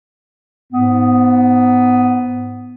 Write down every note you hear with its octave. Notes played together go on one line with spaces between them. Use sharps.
G#2 B3